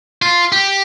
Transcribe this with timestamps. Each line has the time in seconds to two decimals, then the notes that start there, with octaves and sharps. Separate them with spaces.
0.22 F4
0.52 G4